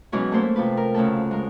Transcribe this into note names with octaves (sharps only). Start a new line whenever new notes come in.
B2 E3 F#3 G#3 C#4
A3 A#3 E4 A4 C5
C3 F3 B4
A#4
D2 C#3 A3 A4
G#3 A#4